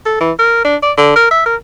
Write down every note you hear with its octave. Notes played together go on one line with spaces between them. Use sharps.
A4
E3
A#4
D4
D5
D3
A#4
E5
A#4